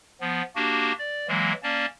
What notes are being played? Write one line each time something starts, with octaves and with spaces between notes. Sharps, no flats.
F3 B3
A#3 D4 F#4 G4
D5
E3 F#3 G#3 A#3
A#3 C#4 D5 A5